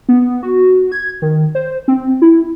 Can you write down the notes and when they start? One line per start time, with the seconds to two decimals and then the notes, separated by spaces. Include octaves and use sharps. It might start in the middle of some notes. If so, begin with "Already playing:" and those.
0.09 B3
0.43 F#4
0.92 G#6
1.22 D#3
1.55 C5
1.88 C4
2.22 E4